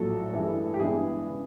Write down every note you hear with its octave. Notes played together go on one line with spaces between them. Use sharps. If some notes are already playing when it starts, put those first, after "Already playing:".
Already playing: A#1 A2 F#3 A4
A1 G2 E3 G#3
G4
G2 E3 G#3 B3 D4 G#4
C#3